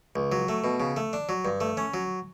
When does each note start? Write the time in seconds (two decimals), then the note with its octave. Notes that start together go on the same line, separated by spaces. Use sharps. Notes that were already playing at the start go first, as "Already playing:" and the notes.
0.16 C#2
0.32 F#3
0.49 A3
0.64 B2
0.80 C#3
0.97 A3
1.13 D4
1.29 F#3
1.45 G2
1.61 A3
1.77 C#4
1.94 F#3